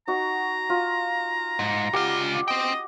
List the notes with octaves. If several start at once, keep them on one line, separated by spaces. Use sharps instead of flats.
D#4 F#4 A#5
F4
G#2
C#2 F4 G4 D5 F#5
C4 D#5 G5